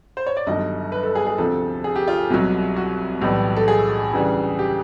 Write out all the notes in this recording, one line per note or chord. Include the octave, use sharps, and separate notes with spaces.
C5
C#5
D5
G1 G2 D#3 F#3 D#5
B4
A4
G#4
G#4
D2 C3 F3 A4
G#4
G4
F4
C2 B2 F#3
F#4
B1 A2 E3 G3
A4
G#4
D2 C#3 E3 G3
G4